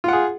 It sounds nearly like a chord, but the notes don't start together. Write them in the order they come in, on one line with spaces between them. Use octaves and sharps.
F4 F#5 G#4